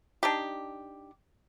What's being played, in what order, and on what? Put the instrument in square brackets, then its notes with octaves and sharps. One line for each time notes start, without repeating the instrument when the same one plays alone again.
[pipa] D4 D#4 G4